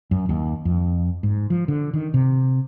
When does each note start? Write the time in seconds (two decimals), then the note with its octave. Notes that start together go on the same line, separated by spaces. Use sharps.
0.11 F#2
0.29 D#2
0.65 F2
1.23 G#2
1.50 F3
1.68 D3
1.93 D#3
2.14 C3